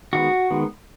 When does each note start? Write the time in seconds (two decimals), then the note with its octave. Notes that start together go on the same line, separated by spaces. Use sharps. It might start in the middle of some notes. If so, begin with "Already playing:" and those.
0.13 D#3 G#3 B3 F#4
0.50 D#3 G#3 B3